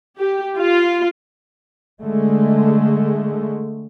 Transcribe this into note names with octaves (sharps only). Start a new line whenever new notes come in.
G4
F4
D3 G#3 A3